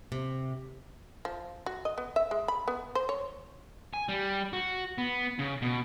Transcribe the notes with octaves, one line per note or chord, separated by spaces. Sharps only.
C3
F3
F#4
D#5
B3
E5
G#3
B5
B3
C5
C#5
G#5
G3
F#4
B3
C#3
B2